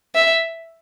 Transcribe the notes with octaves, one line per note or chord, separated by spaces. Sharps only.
E5